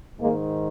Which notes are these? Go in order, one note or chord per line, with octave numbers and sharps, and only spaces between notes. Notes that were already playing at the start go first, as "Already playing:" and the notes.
G#2 D#3 G#3 A#3